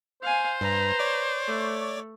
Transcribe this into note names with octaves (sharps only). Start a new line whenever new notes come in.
C5 F5 G#5
G2 B4 A#5
C#5 D5 D6
A3